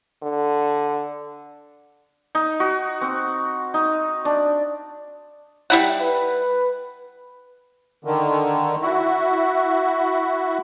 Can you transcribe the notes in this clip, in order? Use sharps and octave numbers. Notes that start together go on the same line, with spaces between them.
D3
D#4
F#4
C4
D#4
D4
G3 E4 F#5
B4
D3 D#3
E4 F#4